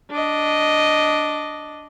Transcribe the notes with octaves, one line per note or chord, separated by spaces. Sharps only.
D4 D#5